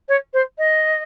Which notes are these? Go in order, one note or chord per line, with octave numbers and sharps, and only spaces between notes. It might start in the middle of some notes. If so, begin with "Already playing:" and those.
C#5
C5
D#5